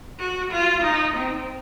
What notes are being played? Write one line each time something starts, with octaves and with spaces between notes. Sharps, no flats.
F#4
F4
D#4
C4